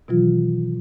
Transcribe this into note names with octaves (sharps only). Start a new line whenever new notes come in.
B2 D#3 E3 F#3 F4